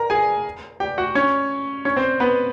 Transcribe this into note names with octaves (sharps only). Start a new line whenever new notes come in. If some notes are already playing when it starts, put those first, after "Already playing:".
Already playing: A#4 A#5
G#4 G#5
G4 G5
F#4 F#5
C#4 C#5
C#4 C#5
C4 C5
B3 B4